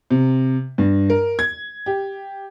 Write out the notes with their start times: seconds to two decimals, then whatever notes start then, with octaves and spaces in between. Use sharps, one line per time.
0.11 C3
0.78 G2
1.10 A#4
1.39 G#6
1.86 G4